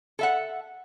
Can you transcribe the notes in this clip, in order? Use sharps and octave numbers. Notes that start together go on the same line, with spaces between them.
A4 E5 F#5